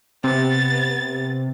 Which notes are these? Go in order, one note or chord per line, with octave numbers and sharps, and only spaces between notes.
C3 B3 A6